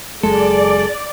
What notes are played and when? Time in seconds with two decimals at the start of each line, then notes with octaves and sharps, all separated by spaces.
0.23 F#1 F#2 G#3 G#4 A4 D5